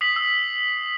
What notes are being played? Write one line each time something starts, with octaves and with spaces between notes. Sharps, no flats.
D#6 B6 C7 F#7
E6